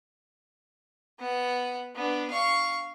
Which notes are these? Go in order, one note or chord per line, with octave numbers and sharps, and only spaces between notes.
B3 F#5
B3 D4
F5 C#6